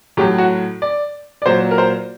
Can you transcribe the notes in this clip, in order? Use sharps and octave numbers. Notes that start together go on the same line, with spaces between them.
A2 F#3 G4
F#4
D5
D5
A#2 F#3 C5
A#4
C5